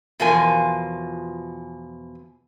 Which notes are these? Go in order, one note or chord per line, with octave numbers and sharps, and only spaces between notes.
E2 B2 F3 F4 A#4 G#5